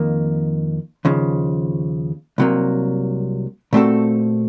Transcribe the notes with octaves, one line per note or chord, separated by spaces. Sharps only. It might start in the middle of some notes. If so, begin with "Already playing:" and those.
Already playing: F2 D#3 A#3
D#2 C#3 F3
C2 C3 F#3 A#3
A#2 A3 C4 F#4 A4